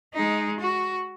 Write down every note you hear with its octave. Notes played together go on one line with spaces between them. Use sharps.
G#3 D#4
F#4